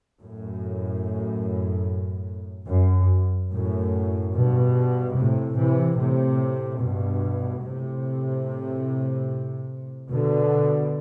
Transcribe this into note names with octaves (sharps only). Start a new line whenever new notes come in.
F#2 A2
F#2
F#2 A2
G2 B2
A2 C3
C3 E3
A2 C3
G2 B2
A2 C3
B2 D3